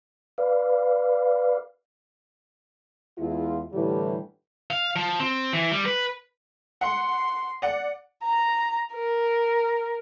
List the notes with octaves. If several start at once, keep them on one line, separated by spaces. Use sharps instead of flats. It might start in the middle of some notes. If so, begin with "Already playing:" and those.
B4 D5 F5
E2 G#3 E4 F4
A2 D3 E3 G3 G4
F5
F3
C4
E3
G3
B4
F#5 C6
D5 F#5
A#5
A#4